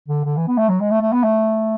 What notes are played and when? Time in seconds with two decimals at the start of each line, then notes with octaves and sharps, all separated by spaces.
0.08 D3
0.25 D3
0.37 E3
0.47 B3
0.58 A3
0.69 F#3
0.80 G#3
0.91 A3
1.02 A3
1.13 B3
1.24 A3